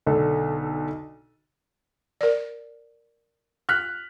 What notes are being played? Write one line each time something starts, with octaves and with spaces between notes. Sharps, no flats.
B1 D3 A4
A#4 D5
F6 F#6 B6